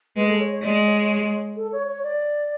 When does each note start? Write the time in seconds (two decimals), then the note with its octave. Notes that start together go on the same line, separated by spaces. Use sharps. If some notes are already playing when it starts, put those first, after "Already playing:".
0.16 G#3 B4
0.28 A4
0.40 C#5
0.51 C#5
0.62 G#3 D5
0.86 C#5
1.56 A4
1.72 C#5
1.88 C#5
2.03 D5